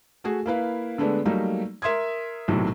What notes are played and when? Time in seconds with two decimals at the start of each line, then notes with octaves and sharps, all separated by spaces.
0.24 A3 F#4 G#4
0.46 A#3 E4 B4 F5
0.98 D3 G#3 A3 B3 D4
1.25 F#3 G3 A3 A#3 D#4
1.82 A#4 E5 C6 D#6 G#6
2.48 B1 A2 C3 D#3 F#3